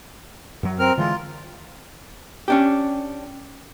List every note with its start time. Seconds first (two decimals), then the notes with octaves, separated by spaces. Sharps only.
0.63 F#2 F#3
0.79 C4 A#4 F6
0.97 D3 E3 G#3 F4
2.48 C#4 D4 G4